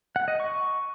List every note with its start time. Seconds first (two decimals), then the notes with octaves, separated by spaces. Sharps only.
0.16 F#5
0.28 D#5
0.40 C#6